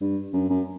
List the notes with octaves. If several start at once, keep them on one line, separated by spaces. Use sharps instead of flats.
G2
F#2
F#2